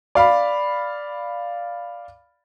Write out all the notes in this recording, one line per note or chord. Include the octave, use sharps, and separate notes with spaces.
D5 F5 B5